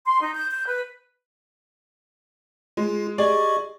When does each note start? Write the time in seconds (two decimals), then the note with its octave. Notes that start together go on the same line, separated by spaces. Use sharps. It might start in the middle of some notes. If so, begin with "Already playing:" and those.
0.06 C6
0.20 D#4
0.34 G6
0.49 G6
0.66 B4
2.77 G#3 F4
3.18 G4 G#4 D5 D#5 C#6